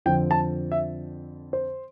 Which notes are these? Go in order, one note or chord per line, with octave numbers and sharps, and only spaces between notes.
F2 D3 F3 C4 G5
A5
E5
C5